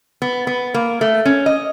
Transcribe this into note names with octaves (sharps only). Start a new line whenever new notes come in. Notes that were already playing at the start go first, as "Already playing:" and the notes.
B3
B3
A#3
A3
C#4
D#5